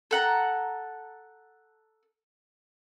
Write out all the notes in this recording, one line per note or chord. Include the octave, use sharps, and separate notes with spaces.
A4 F#5 A#5